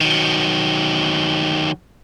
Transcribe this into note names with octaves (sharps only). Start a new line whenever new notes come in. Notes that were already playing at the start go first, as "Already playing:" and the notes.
D#3 F#3